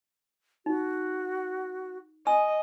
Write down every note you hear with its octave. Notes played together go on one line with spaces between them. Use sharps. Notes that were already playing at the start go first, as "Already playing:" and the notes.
D#4 F#4
D#5 G#5 E6